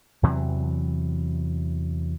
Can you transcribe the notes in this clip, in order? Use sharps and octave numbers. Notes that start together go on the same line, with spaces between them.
E2 C3 E3 F#3